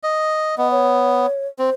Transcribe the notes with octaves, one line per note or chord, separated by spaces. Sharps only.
D#5
B3 D#5
C#5
C4 C5